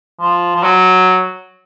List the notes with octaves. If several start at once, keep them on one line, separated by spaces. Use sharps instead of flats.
F3
F3
F#3